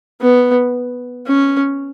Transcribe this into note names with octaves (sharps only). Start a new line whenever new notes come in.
B3
C#4